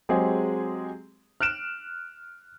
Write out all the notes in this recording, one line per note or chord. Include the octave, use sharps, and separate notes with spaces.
F#3 G#3 C4 G4 G#4
F6 F#6 D7 E7